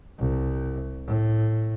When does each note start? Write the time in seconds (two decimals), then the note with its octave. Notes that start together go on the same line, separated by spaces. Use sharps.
0.18 C2
1.06 A2